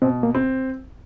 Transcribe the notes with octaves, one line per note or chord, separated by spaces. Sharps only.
B2 C4
A#3
C4